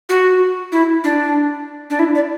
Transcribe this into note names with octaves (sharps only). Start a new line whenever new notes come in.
F#4
E4
D4
D4
E4
D5